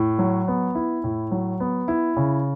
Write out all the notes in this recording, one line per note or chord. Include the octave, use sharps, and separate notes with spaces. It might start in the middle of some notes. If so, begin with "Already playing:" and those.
Already playing: A2
F#3
B3
E4
A2
F#3
B3
E4
C#3